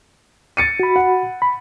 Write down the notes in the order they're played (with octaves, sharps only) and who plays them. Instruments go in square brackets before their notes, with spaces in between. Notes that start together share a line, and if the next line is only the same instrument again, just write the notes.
[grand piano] A6 C#7 D#7
[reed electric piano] F#4 B5
[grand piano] F#5
[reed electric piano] B5